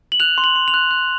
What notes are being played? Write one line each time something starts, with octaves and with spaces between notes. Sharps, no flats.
F#7
F#6 F7
C6
F#7
C6
F7
F#6
F#6